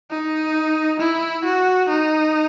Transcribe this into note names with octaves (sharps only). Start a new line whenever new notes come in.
D#4
E4
F#4
D#4